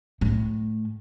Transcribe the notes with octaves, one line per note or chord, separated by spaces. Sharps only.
A2